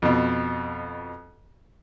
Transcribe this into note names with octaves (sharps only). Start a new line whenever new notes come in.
F2 B2